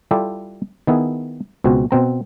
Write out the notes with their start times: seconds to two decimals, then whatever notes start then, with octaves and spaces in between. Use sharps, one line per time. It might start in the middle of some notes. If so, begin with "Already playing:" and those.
0.11 G3 E4 F4 G4 A4
0.87 D#3 B3 E4 G#4
1.64 C#2 B2 C4 F#4
1.91 B2 C4 A#5